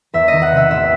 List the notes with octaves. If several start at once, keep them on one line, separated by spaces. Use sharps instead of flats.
E2 E5
D#3 D#5
F#5
C3 E5
A1 E5